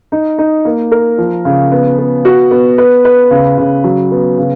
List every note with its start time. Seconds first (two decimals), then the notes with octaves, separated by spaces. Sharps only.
0.12 D#4
0.38 D#4
0.65 A#3
0.91 A#4
1.18 F3
1.45 C#3
1.71 B3
1.99 B3
2.25 F#4
2.51 B3
2.78 B4
3.05 B4
3.31 C#3
3.58 C#3
3.84 F#3
4.11 B3
4.38 C#3